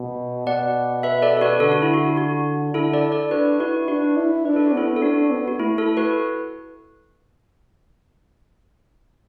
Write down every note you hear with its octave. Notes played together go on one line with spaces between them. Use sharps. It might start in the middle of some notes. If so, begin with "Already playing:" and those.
Already playing: B2
B2 D5 F#5
B4 E5
A4 D5
A4
F#4 B4
D3 A4
F#4
E4
F#4
F#4
D3 E4 A4
A4 D5
A4 D5
D4 F#4 B4
E4 F#4 B4
D4 F#4 B4
E4
D4 B4
A4
F#4
B3 E4 A4
A4
D4 F#4
B3
F#4
A3 E4
E4 A4
F#4 B4